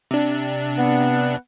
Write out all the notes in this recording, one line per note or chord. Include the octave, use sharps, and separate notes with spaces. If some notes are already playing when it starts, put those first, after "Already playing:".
C3 D4
B3 F#5